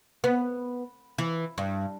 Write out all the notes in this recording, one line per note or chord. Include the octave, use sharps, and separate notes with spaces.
B3
E3
G2